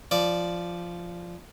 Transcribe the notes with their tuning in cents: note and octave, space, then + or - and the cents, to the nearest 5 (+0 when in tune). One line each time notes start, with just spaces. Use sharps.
F3 -10 D5 +0